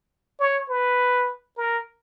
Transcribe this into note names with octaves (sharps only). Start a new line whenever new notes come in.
C#5
B4
A#4